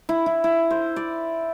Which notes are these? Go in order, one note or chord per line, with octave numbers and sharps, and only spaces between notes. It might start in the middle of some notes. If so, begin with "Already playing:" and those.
E4
E4
E4
C5
D5